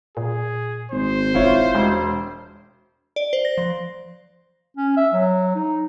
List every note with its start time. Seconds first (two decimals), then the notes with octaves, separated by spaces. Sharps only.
0.17 A#2 G#4
0.92 G#1 C5
1.34 E1 E4 F4 C#5
1.75 E1 G#3
3.16 D5
3.33 C5
3.45 A#6
3.58 F3
4.77 C#4
4.97 E5
5.14 F#3
5.55 D#4